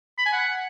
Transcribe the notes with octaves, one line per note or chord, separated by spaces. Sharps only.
B5
G#5
F#5